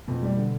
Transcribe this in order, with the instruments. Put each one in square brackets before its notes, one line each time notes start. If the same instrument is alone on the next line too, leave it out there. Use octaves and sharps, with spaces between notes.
[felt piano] F2 [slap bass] B2 B3
[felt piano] G3
D3